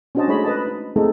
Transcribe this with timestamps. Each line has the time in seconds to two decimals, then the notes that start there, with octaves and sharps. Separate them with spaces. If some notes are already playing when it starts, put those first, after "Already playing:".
0.15 C#4 D4 F#4 C5 D#5 A5
0.28 G#3 A3 D#4 C#5 D#5 B5
0.44 B4 D#5 A5
0.67 D#4
0.96 G#3 A3 C4 D#4 G#4 A4